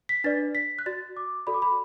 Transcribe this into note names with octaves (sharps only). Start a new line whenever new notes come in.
B6
D4 B4 D5 A6
B6
F#6
F#4 D5 A6
D6
F#4 A4 D5 B5
D6
B5